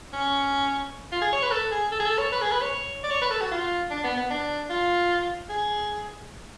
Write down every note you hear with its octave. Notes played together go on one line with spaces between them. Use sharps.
C#4
F4
G#4
C#5
B4
A4
G#4
A4
G#4
A4
C#5
B4
G#4
B4
C#5
D5
C#5
B4
A4
F#4
F4
D4
B3
B3
D4
F4
G#4